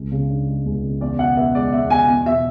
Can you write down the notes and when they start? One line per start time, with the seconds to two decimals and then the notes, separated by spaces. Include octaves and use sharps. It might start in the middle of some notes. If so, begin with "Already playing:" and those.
Already playing: C#2
0.11 C#3
0.30 D4
0.48 G#3
0.66 C#2
0.83 C#3
1.01 E2 D5
1.19 B2 F#5
1.36 B3 E5
1.55 G#3 D5
1.72 E2 E5
1.90 B2 G#5
2.08 E2
2.26 B2 E5